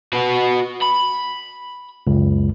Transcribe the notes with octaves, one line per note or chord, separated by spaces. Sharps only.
F#4 B4
B5
C#2 F#2